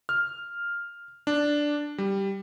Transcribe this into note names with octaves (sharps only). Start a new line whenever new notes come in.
F6
D4
G3